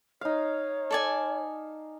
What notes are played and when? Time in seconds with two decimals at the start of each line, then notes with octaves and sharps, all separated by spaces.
0.21 D#4 C#5 F5
0.91 A4 D5 G#5